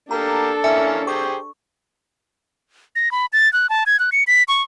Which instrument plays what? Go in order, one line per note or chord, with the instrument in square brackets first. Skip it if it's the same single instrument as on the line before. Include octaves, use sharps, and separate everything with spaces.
[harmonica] A#3 G4 [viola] D4 A4 [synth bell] A#5
[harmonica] E3 A#3 C#4 [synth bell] E5 G#5 C#7
[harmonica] G4 G#4 C5 [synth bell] C#6
[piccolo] A#6
B5
A6
F#6
A5
G#6
F#6
C#7
B6
C#6